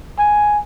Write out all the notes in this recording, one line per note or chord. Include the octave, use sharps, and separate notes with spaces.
G#5